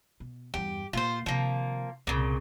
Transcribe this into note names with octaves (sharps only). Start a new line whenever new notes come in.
B2
E2 G2 G4
A#2 A#3 F4 C5
C3 D#3 F3 A#3
C2 A#2 C#3